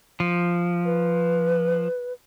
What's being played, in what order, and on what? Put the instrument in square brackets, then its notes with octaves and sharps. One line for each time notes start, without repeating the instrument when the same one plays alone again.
[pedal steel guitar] F3
[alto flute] B4